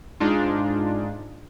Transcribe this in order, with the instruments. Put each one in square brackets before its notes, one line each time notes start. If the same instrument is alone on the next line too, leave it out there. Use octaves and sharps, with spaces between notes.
[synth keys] G#2 G#3 D4 D#4 F4